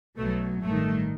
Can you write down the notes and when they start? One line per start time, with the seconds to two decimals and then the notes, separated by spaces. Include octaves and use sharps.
0.16 B1 B2 F#3 A3
0.62 A1 G2 D#3 A3